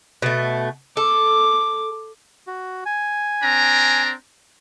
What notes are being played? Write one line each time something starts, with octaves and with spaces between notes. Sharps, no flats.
B2 A3
A4 D6
F#4
G#5
C4 D4 A#5